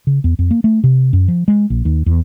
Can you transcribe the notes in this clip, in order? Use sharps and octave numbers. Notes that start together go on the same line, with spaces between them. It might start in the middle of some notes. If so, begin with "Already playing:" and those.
C#3
E2
F2
A#3
A3
C3
F#2
F3
G#3
A#1
D#2
E2